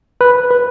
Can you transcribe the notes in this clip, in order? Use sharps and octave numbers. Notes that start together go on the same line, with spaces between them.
B4
B4